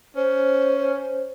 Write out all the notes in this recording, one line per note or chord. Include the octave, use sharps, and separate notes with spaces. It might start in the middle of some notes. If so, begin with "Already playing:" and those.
C#4 C5